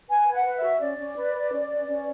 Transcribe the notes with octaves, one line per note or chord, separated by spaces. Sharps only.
B4 G#5
B4
F#5
B4
E5
F#4
C#4 D5
C#4
B4
B4
C#4
B4
C#4